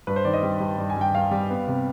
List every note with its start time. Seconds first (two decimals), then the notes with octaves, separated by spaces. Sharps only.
0.07 G2 B4
0.16 C5
0.25 D#3 D5
0.33 D#5
0.43 G3
0.60 G2
0.78 G2
0.90 G#5
0.96 G2 G5
1.15 G2 F5
1.31 G3
1.50 B3
1.68 C3